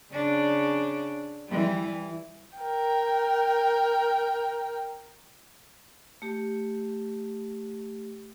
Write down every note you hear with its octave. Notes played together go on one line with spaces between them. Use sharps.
C#3 D4
E3 G3
A#4 G5
A3 G4